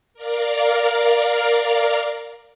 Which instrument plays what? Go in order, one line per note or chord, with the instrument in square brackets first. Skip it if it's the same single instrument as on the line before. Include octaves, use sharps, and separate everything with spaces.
[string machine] A#4 D5 F5